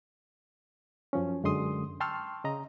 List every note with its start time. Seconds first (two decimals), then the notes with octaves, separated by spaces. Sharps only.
1.13 F#2 F3 C#4
1.44 F#2 D3 G#3 C6 D#6
2.00 G5 A5 C6 C#6 E6 F6
2.44 C#3 D#5 A#5